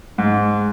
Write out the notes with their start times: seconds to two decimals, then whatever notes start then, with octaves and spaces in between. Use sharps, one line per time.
0.18 G#2